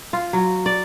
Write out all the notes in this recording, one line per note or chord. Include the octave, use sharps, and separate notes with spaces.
F4
F#3
D5